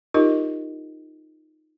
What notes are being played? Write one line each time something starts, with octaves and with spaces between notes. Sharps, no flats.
D#4 F4 G4 A#4 D#5